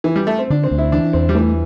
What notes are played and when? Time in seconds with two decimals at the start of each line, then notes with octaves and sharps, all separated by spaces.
0.04 E3
0.16 G3
0.27 A3
0.39 C4
0.50 D3 D4
0.64 C4
0.71 D2
0.78 E4
0.92 E3 D4
1.13 E2 C4
1.29 G3
1.35 E3 A3